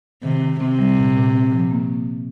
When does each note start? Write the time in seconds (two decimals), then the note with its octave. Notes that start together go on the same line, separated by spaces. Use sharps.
0.23 C3 D#3
0.42 D#3
0.60 C3 C4
0.79 G3
0.97 A#2
1.16 A#2
1.33 C4
1.52 F3
1.71 A#3